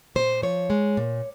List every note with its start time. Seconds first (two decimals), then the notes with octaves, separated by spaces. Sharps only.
0.15 A#2 C5
0.42 F3 C#5
0.70 G#3
0.97 A#2